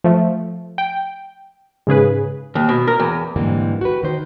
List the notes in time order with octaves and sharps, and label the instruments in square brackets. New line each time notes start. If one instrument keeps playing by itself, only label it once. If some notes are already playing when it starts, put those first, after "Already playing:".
[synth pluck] F3 A3
G5
G#2 C#3 G#4 B4
[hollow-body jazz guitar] D#2
B2
A#4
E2
[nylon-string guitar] G#2 D3 E3 G3 A#3 C4
F#4 G4 B4
D#3 C5